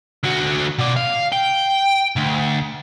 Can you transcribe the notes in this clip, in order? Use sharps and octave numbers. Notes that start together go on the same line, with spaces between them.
D3 F#4
B2 D5
F5
G5
D2